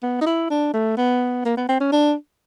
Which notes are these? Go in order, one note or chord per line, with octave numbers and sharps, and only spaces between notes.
B3
D#4
E4
D4
A3
B3
A#3
B3
C4
C#4
D4